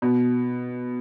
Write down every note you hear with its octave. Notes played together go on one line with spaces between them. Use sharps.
B2